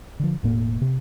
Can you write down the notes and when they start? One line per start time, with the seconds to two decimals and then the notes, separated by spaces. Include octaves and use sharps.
0.20 D3 F3
0.43 E1 A2 A#3
0.81 C3